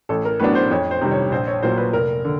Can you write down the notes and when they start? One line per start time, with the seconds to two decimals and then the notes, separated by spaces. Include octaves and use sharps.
0.09 A1 A4
0.25 A#4
0.40 A2 F#3 B3 D4 B4
0.55 C5
0.71 F2 C#5
0.91 C5
1.01 C3 D#3 G3
1.11 C#5
1.32 A#1 C5
1.47 C#5
1.63 A#2 F#3 A#3 C5
1.78 B4
1.93 F1 A#4
2.25 D3